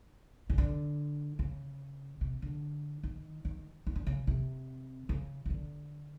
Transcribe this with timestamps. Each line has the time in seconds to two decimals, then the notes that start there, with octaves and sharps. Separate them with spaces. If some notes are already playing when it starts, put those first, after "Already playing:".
0.50 C#3
0.58 D3
1.39 C#3
2.21 C3
2.42 D3
3.03 D#3
3.45 D#3
3.87 D#3
3.96 D3
4.07 C#3
4.27 C3
5.09 C#3
5.46 C#3
5.50 D3